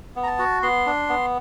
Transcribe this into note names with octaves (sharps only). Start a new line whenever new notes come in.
B3
A#5
A5
F#4
B3 C6
D4
B3